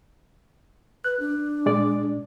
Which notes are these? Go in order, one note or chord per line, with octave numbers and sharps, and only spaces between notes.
B4 F#6
D4
A#2 G#3 D5